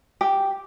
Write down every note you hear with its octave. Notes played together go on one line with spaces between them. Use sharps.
G4